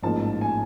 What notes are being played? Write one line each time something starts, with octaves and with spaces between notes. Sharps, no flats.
A1 G#2 F3 A#3 A5
G#5